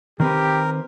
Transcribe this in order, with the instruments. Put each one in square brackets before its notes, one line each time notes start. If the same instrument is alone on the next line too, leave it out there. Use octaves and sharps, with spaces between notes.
[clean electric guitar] D#3 C4 B4 [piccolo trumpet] G4 [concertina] A#4